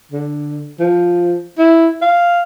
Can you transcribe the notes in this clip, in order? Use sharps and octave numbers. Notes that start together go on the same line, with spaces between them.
D3
F3
E4
F5